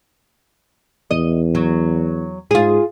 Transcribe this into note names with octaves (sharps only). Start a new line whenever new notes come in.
E2 D#5
F#3
G#2 F4 G#4